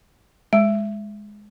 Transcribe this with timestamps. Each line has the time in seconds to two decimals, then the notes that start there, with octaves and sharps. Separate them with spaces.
0.53 G#3